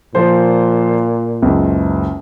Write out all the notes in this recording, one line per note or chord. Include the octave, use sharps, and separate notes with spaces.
A#2 F3 C5
F#1 C#2